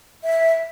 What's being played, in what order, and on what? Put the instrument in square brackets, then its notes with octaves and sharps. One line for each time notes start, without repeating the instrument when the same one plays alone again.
[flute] E5